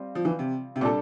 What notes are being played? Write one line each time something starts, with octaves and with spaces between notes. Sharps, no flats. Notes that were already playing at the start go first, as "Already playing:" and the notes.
Already playing: G3 C4 F4
F3
E3
C3
C3
A#2 G3 D4 A4